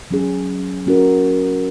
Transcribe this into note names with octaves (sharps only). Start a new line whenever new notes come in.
F#3 C#4 G#4
F#3 C#4 F#4 A#4